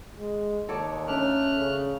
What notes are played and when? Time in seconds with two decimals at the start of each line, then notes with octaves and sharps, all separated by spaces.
0.19 G#3
0.69 D#2 A4 C#5 D5
1.08 A3 C#4 D4 F6 F#6
1.58 C#3